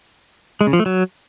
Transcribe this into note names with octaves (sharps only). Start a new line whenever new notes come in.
G#3
C#3
F3
A3
F#3